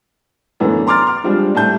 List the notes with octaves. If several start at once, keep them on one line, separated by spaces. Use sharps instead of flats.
F#2 D3 E3 A3 B3
A#5 C6 D6 F6 A6
F6
F3 G3 G#3 C4 D4
A2 G3 A5 G6